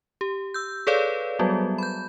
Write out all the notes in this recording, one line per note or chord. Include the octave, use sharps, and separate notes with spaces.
G4
E6 G6
G#4 A4 B4 C#5 D5 F5
F#3 G3 B3 F#4
B5 G6